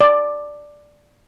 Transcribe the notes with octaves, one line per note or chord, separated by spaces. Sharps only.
D5